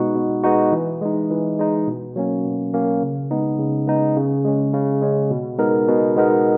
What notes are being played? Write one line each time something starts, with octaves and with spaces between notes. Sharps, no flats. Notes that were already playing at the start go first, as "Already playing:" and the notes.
Already playing: B2 G#3 B3 D#4 F#4
B2
G#3 B3 D#4 F#4
E3
G#3 D#4
E3
G#3 D#4
B2
F#3 A#3 C#4
B2
F#3 A#3 C#4
C#3
G#3 B3 D#4
C#3
G#3 B3 D#4
C#3
G#3 C#4
C#3
G#3 C#4
B2
G#3 B3 D#4 A#4
B2
G#3 B3 D#4 A#4